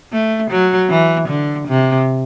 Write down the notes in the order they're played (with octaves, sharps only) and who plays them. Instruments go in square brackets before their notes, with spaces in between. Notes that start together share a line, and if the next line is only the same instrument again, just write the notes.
[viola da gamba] A3
F#3
E3
D3
C3